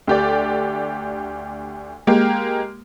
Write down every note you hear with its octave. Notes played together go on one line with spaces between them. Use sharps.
D2 G4 D5
G#3 A#3 G4